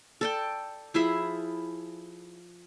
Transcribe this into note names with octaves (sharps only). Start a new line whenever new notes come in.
A4 D5 G5
F3 E4 G#4 E5